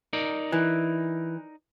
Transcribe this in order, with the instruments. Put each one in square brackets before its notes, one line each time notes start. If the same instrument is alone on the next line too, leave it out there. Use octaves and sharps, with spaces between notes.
[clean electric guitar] D#4 A#4 D5
[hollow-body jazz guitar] E3